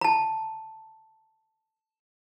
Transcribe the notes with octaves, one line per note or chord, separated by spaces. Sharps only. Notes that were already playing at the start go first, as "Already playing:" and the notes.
A5 A#5